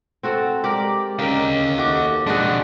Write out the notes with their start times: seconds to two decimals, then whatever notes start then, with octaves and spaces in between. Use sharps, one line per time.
0.23 C4 F#4 A4
0.64 G#3 G4 A#4 D5
1.19 C#3 D#4 A#4 D#5 F5 G5
1.78 D#2 A3 F#4 D6
2.27 G#3 C4 D4 D#4 F#4 G#4 F#5